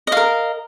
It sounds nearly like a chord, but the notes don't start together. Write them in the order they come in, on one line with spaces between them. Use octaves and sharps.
D#5 F5 A#4